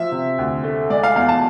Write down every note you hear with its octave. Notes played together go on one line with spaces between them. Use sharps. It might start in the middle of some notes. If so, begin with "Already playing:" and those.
Already playing: F3 E5
C3
D2
A3
G#3 D5
F5
E2 F5
A5